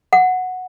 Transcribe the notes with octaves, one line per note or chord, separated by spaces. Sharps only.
F#5